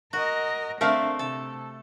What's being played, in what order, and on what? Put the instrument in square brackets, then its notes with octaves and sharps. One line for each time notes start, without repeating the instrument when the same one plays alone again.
[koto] F#4 [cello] A#4 D#5
[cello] D3 C4 [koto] A3 [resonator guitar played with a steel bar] A#4 E5 F5
[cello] C3 [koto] A4